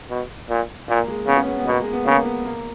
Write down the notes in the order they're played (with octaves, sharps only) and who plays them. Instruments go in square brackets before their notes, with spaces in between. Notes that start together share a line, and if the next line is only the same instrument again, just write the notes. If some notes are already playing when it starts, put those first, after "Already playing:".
[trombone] B2
A#2
[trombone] A#2 [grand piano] A#3
[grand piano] G#3
[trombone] C#3 [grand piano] B3
[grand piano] C#4
B3
B3
[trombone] B2 [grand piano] A#3
[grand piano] G#3
B3
[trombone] C#3 [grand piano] A#3
[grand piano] B3
A#3